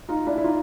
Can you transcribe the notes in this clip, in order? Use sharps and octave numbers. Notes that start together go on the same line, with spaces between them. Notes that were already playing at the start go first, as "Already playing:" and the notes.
D#4 F4
D4 E4
E4
D#4 F4